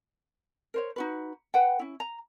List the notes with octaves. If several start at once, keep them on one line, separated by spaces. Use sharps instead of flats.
A#4 C5 C#5
D#4 F#4 B4
B4 F#5 G5
C#4 E4
A#5